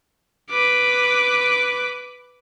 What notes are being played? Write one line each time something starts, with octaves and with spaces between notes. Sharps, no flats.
B4 D6